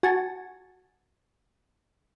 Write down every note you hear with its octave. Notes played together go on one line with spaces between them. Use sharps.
F#4 G#5 A5